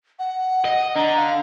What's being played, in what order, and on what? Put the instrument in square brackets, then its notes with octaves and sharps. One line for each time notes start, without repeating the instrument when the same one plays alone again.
[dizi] F#5
[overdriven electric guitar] D#5
[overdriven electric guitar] D3 [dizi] A#5
[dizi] F5